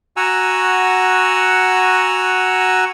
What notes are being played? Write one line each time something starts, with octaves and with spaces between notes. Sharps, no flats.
F#4 F#5 G#5 A#5 E6